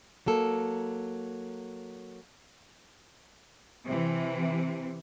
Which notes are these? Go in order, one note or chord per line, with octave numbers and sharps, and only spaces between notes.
F#3 A#3 A4
C3 E3